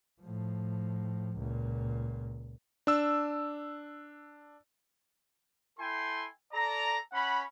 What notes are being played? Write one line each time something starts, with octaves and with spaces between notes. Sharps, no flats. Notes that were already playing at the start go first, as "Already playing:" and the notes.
A2 F3
C#2 A#2
D4 E6
E4 A4 G5 G#5 C6
A4 D5 A#5
C#4 F#5 B5